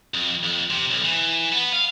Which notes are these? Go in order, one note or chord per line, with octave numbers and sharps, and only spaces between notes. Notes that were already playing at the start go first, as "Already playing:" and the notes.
F2
F2
C3
B1
E3
B3
F5